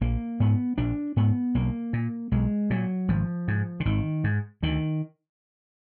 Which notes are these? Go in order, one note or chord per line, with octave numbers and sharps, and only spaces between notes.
A#1 A#3
G#2 B3
A#1 D4
G#2 B3
B1 A#3
A#2
B1 G#3
A#2 F#3
G#1 F3
G#2
D3
G#1 D#3
G#2
D2 D#3